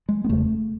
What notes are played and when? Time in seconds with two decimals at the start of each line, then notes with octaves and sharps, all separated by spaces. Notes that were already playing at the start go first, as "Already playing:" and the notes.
0.09 G#3
0.24 B3
0.29 E1 E2 C#3 A3